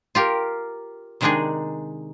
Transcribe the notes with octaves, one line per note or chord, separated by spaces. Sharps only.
F4 G4 A#4
C3 D#3 G#3 D4 D#4 G#4